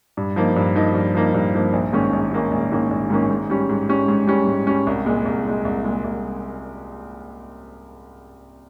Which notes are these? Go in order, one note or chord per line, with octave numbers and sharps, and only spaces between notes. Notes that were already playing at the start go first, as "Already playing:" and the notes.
G2
F3 A#3 D#4
G2
F3 A#3 D#4
G2
F3 A#3 D#4
G2
F3 A#3 D#4
A#1
G#2 D#3 A#3 C#4
A#1
G#2 D#3 A#3 C#4
A#1
G#2 D#3 A#3 C#4
A#1
G#2 D#3 A#3 C#4
G#2
G3 C#4
G#2
G3 C#4
G#2
G3 C#4
G#2
G3 C#4
C2
A#2 G#3
C2
A#2 G#3
C2
A#2 G#3
C2